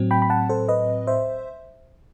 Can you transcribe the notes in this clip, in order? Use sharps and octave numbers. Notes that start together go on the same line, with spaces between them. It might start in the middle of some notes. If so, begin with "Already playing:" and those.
Already playing: A2 F#3 C4
G5 B5
B5
F#5 A5
A4 C5
B4 D#5
C5 E5